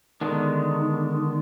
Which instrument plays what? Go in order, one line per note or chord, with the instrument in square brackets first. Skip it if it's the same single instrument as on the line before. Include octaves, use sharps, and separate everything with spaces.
[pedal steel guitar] D3 G#3 B3 D4 [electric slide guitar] D#3